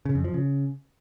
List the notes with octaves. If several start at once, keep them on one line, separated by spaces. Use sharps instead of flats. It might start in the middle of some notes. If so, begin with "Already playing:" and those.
C#3
F2
F3
C#3